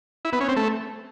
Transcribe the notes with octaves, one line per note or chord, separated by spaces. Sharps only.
E4
B3
C#4
C4
A3